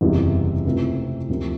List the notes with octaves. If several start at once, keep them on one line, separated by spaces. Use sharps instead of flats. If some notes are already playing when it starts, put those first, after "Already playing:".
F#1 E2 C3 E3 G3
C#2 C3 E3 A3 C4
D2 C3 F3 A#3